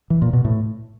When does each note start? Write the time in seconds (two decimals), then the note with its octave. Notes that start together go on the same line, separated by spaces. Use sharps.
0.10 E3
0.22 A#2
0.33 B2
0.45 A2